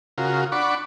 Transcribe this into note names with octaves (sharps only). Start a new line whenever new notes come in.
C#3 F4 F#4 A#4
D4 F#5 B5 C#6 D6